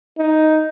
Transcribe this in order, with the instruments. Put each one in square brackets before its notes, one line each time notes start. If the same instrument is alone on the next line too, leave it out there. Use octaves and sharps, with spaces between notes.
[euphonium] D#4